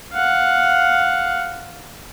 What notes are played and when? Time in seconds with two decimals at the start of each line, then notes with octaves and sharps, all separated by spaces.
0.13 F5 F#5